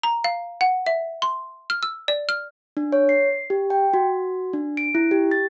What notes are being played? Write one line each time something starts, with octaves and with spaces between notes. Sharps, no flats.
A#5
F5
F#5
E5
C6
F6
E6
D5
F6
D4
C#5
C7
G4
G5
F#4
D4
D7
E4
G4
A6